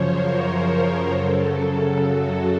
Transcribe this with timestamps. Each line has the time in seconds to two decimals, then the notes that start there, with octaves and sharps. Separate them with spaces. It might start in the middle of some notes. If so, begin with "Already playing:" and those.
Already playing: F#2 C#3 F3 C5 C#5
0.11 A#4
0.58 A#4
1.04 F#2 C#3 F#3 A4
1.97 F#4